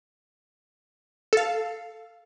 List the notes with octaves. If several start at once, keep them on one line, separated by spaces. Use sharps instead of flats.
A4 F5